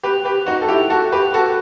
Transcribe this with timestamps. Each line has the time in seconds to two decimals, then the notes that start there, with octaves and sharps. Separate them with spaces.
0.03 G4 B4
0.25 G4 B4
0.46 D#4 F#4
0.61 A4
0.68 E4 G4
0.90 F#4 A4
1.12 G4 B4
1.34 F#4 A4